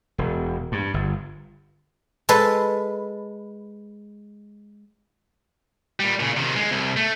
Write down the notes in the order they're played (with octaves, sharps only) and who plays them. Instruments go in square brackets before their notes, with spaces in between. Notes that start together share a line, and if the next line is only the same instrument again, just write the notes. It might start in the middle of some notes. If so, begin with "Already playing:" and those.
[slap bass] E1
G2
G1
[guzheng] G#3 A4 B4
[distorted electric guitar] A#2 G3
A#2 C#3
C3 D#3
B1 G#3
C2
A3